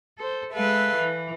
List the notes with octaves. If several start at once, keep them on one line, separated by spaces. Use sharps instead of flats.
A4 C5
G#3 A4 B4 E5 F5
E3